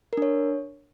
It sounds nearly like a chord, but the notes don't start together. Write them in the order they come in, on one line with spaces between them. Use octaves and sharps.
A#4 D4 C#5